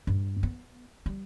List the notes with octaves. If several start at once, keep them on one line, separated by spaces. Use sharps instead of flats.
G2
B3
G3